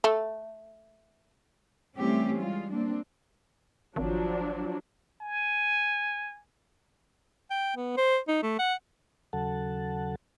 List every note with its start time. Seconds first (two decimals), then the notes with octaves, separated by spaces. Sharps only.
0.04 A3
1.97 E3 G3 A3 C4 C#4 G4
2.39 G3 G#3 F4
2.72 A#3 C4 D4
3.96 G#1 F3 F#3 D4
5.21 G#5
7.50 G5
7.76 B3
7.97 C5
8.28 D#4
8.43 A3
8.59 F#5
9.33 D#2 C#3 F#3 A4 F#5 A5